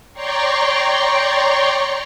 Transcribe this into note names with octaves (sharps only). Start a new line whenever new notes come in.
C#5 D5 G5 A#5 C6 C#6